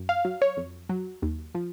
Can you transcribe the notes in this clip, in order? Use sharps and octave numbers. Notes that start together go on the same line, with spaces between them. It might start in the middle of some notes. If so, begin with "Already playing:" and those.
Already playing: F#2
F5
F#3
C#5
F2
F#3
D#2
F3